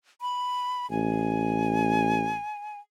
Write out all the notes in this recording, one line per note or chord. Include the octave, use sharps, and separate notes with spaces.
B5
A1 G#5